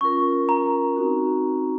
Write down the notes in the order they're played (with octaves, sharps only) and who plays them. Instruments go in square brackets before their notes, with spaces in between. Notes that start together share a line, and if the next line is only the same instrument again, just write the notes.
[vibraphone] C#4 F4 A#4 [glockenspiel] C#6
[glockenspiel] A#5
[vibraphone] C4 D#4 F#4